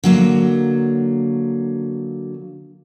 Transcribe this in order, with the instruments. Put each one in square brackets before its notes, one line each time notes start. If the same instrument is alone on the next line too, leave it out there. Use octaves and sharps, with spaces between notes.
[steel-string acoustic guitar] D3 F#3 A#3